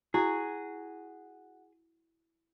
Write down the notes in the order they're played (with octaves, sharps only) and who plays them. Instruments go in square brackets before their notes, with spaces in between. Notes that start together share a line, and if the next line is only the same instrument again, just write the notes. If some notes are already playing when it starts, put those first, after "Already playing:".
[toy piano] E4 [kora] F#4 [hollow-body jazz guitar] G#4